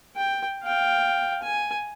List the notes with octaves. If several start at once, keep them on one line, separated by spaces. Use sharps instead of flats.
G5
F5 G5
G#5